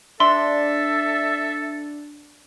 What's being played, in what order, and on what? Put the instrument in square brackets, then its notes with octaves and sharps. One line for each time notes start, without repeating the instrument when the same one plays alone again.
[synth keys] D4 [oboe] A4 [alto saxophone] E5 [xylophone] C6